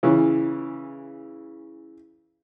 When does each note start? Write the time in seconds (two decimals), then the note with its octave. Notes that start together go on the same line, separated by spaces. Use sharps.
0.03 C#3 E3